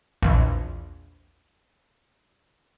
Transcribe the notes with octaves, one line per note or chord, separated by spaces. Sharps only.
A#1 E2